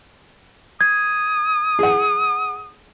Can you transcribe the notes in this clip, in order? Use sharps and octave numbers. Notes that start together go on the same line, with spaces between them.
D#6 G#6
G#4 F#5